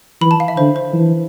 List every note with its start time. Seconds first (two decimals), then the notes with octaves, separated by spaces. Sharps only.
0.21 E3 B5
0.31 A5
0.40 F5
0.48 E5
0.57 D3 C5
0.76 C5
0.93 E3